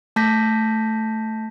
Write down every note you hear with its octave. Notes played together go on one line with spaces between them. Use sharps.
A3 A5 G6 A#6 B6